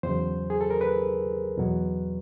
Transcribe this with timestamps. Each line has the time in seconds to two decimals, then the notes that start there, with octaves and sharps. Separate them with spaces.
0.03 E2 C#3 F#3 C5
0.50 G#4
0.61 A4
0.70 A#4
0.81 B4
1.57 E2 B2 F#3